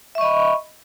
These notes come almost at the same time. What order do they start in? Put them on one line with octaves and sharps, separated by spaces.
E5 C#6 D#5 B5